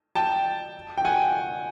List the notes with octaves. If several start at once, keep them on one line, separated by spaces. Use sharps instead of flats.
G5 A5
G5
F#5 G#5